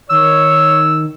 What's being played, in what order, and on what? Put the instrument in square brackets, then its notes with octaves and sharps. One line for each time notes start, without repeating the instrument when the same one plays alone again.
[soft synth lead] D#3 [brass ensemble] C#5 [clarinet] E6